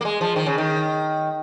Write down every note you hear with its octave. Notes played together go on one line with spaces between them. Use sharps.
A#3
G#3
F3
D#3
C#3
D#3